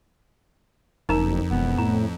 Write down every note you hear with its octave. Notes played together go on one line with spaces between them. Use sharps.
F#1 F2 D#4 A#4 A#5
E1 B3
A2 A#5